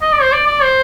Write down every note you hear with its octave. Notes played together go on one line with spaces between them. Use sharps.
D#5
D5
C5
D5
D5
C5